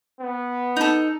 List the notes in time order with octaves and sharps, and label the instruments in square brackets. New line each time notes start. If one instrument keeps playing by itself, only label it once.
[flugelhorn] B3
[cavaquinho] D#4 A4